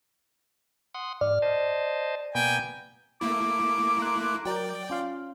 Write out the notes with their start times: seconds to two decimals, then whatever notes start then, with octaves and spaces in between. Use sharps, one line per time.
0.94 F#5 C6 D#6
1.21 G#2 D5 F6
1.42 C5 D#5 A5
2.35 B2 A#3 B3 G5 G#5
3.21 A3 A#3 E4 D6
3.99 A#5 C6 F#6
4.45 F#3 A#4 D5 G5
4.90 C#4 F4 F5